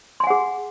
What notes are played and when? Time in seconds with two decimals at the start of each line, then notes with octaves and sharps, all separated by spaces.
0.20 C6
0.24 G#5
0.27 F#5
0.30 G#4